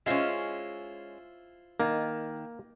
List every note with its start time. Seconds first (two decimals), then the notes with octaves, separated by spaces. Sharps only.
0.06 G#3 C#4 E4 F4 C5
1.80 D#3 A#3